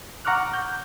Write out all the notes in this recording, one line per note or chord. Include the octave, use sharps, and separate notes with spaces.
F#5 A#5 C#6 D6 F6 F#6
G6